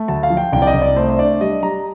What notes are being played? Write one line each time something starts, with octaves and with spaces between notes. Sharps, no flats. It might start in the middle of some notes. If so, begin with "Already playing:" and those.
Already playing: A3
D2 A5
F5
F3
G5
C2 G5
D5
D#5
C2
D5
A3 C5
C5
D4 D5
G3 D#5
G3 A#5